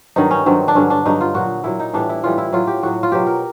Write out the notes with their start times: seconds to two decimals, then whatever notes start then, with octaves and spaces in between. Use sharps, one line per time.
0.16 G2 D#3 F#3 D#4
0.31 C#4
0.46 G2 D#3 F#3 C4
0.68 D4
0.75 G2 D3 F#3 C#4
0.90 D4
1.05 G2 D3 F#3 D#4
1.21 F4
1.35 A#2 F#3 F#4
1.64 A#2 F#3 E4
1.80 D#4
1.93 A2 E3 G3 D4
2.09 E4
2.24 A2 E3 G3 F4
2.38 E4
2.53 A2 F#3 F4
2.67 G4
2.83 A2 F#3 F#4
3.03 F4
3.12 B2 F#3 G4
3.27 A#4